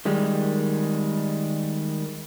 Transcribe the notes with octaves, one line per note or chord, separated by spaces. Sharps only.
D#3 G3 G#3